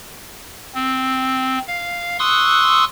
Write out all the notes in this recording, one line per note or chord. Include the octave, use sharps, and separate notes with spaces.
C4
F5
C6 C#6 D#6 E6 F#6